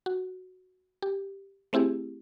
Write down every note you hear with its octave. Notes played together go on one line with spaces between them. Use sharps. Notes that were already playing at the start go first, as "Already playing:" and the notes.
F#4
G4
A3 C4 E4 G4 G#4